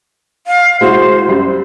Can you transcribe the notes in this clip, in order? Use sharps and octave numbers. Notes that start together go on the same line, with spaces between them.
F5
G#3 E4 F#4 C5
F#2 G3